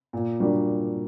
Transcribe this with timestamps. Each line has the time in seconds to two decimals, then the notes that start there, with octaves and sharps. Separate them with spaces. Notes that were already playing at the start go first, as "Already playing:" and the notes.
0.13 A#2
0.40 G3 A#3 D4 F#4